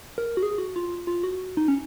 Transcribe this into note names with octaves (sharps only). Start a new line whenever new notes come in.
A#4
F#4
G#4
F#4
F4
F4
F#4
D#4
C#4